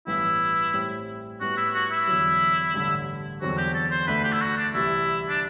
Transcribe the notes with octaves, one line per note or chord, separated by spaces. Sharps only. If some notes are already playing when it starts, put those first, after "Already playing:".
A1 G2 E3 B3 E4
A2 G3 C4
A2 G3 B3 F#4
E4
F#4
E4
E2 D3 F#3
A1 G2 D3
E2 D3 F#3 C4 F#4
G4
A4
C5
D2 D3 A3 B4
G4
E4
F#4
D4
C2 C3 E3 E4
D4